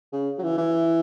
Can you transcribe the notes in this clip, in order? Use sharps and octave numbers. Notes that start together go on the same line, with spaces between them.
C#3
F#3
E3
E3